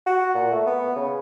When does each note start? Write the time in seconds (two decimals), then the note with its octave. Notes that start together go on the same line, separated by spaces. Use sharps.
0.06 F#4
0.35 A#2
0.51 A3
0.67 B3
0.96 C#3